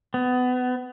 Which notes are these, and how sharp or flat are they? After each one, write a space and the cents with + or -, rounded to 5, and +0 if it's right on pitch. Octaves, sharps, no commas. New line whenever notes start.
B3 +25